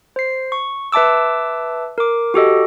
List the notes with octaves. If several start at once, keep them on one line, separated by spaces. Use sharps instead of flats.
C5 C7
C#6
B4 E5 A5 D6 E6
A#4 D6
F#4 G4 A4 D#5